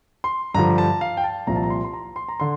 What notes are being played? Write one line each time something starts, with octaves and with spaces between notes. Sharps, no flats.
C6
G2 D3 F3 A#5
A5
F5
G5
A5
C2 A#2 F3 A#5
A5
A#5
C6
C6
A#5
C6
A#5
D3 C6